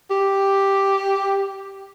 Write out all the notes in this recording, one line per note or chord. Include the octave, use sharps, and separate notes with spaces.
G4